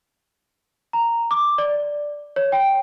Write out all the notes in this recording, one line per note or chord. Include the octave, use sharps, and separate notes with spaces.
A#5
D6
D5
C#5
G5